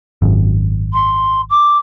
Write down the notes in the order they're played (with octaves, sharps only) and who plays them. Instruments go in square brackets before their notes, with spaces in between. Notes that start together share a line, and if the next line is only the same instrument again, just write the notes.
[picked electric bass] G#1 F#2
[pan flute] C6
D6